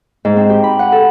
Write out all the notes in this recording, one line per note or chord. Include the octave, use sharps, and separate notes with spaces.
G#2
C4
G4
B5
F#5
A4